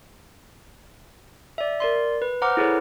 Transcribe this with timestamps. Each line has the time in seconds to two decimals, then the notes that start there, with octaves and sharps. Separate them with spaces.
1.58 D5 E5
1.80 A#4 D5 C6
2.22 B4
2.42 C5 F#5 A#5 D6 F6
2.57 E4 G#4 A4 B4 C#5